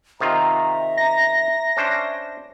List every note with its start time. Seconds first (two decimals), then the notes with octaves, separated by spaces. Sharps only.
0.21 C3 D#3 F4 E5 A#5
0.97 A#6
1.77 C#4 D4 C5